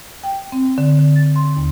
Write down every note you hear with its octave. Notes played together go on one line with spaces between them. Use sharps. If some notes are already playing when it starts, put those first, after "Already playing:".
G5
C4
D3
D3
A6
C6
D#2